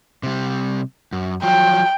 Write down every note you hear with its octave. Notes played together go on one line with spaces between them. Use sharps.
C3 G3
F#2
F3 F#3 G5